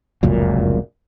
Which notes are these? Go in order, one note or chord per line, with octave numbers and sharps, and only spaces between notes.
F1 C#2 F#2 A#2